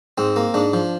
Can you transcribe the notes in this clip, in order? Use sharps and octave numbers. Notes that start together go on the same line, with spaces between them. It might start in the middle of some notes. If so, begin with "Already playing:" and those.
G#2 C4
A#3
G#2 D4
F3